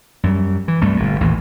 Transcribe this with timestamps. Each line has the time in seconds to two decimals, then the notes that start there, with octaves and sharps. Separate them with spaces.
0.23 F#2 G3
0.68 E3
0.81 C2 G2 A3
0.97 G1 A#2
1.20 A1 D#2 A#2 E3